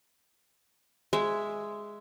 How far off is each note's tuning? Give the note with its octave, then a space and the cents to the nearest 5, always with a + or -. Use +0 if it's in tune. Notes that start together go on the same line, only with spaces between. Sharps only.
G#3 +0 E5 +0